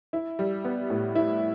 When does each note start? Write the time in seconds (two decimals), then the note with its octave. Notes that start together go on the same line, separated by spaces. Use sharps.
0.13 E4
0.39 G3
0.65 B3
0.90 A2
1.15 E4